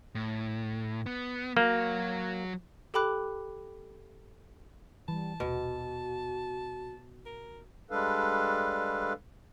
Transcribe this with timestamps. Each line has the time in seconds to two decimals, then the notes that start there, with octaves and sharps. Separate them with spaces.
0.15 A2
1.06 B3
1.57 F#3 A#3 F#4
2.94 G4 A4 G5 B5 D6 F#6
5.08 E3 G3 A5
5.40 D#1 B2 F#4
7.26 A#4
7.91 G3 G#3 D4 A4 B4 F5